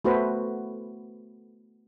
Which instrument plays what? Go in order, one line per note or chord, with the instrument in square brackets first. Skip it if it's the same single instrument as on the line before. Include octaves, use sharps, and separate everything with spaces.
[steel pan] A3 B3 F#4 A4 B4 C5